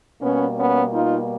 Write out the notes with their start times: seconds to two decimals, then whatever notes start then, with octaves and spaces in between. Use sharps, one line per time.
0.21 B2 G3 A#3 B3 C#4
0.57 B3 C#4
0.92 D#4 F4